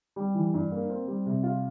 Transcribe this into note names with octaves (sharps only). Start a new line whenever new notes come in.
G3
E3
G2
A#3
C4
G3
C3
F4